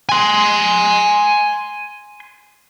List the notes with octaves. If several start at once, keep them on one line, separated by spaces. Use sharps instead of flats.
G#5 C6